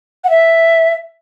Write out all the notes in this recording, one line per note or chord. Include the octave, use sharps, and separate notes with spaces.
F#5
E5